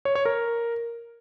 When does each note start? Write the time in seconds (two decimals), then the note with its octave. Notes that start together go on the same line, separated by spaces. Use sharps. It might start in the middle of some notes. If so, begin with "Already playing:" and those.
0.05 C#5
0.15 C#5
0.25 A#4